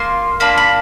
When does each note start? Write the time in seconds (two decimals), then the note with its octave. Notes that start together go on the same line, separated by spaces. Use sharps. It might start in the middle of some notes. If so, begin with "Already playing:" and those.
Already playing: A#3 F4 C6
0.40 A#3 D4 F4 B5
0.57 B5